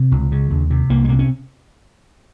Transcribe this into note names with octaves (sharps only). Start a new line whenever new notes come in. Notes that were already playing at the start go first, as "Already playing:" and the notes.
Already playing: C3
C#2
C#3
D#2
C3
C2 A#3
G#3
C3 A#3
C#4